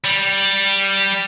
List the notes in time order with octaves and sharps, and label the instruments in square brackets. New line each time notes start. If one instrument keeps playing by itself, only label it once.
[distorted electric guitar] G3